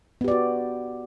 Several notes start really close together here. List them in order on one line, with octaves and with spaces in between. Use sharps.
B3 G4 D5 F#4